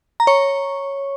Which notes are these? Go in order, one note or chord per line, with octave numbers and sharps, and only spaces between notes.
A#5
C#5 C#6